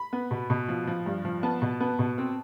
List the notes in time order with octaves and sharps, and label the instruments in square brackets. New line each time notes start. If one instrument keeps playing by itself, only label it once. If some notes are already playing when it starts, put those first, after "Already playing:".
Already playing: [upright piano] B5
B3
B2
B2
F3
F3
G2
F3
B3 A5
B2
B3
B2
C4